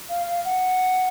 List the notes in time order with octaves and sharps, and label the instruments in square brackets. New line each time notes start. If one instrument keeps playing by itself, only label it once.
[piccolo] F5
F5
F#5